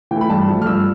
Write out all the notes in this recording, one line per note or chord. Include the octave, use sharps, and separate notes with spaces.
E3 A3 G5
B5
G2 A5
F3 A3
F6
G2 E6